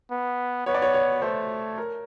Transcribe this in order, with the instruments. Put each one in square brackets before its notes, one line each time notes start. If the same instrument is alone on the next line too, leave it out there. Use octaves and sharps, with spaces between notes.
[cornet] B3
[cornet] B3 [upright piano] C#5
[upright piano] D5
C#5
C#5
[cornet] A3 [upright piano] C5
[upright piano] A#4